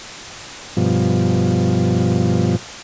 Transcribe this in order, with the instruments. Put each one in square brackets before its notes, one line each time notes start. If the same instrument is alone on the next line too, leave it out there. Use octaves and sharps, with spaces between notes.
[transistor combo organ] G2 B2 F3